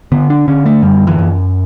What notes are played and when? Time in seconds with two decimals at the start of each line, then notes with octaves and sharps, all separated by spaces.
0.12 D3 B3
0.30 D4
0.48 D3 C#4
0.66 A3
0.82 F#2 G3
1.07 E3
1.18 F#2